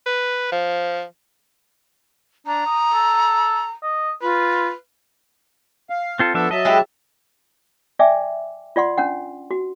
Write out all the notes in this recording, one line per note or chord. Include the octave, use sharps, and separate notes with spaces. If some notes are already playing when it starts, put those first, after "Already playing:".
B4
F3
D4 A#5
D#6
A4
D#5
F4 B4
F5
C4 F4 A4
F3 B3 D4 A4 E5
F#3 D#5 E5 A5
G#3 E4 G4
D5 E5 G5 G#5 D6
F4 D5 F#5 C6
C#4 D4 F#5
F#4